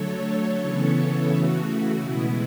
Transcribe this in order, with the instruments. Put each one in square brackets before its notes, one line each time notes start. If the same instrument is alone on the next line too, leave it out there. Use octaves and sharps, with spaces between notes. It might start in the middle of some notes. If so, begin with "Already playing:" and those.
Already playing: [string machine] D3 F#3 A3 A4 C#5
C#3 E3 B3
C#3 E3 A3 F#4
B2 G#3 B3 E4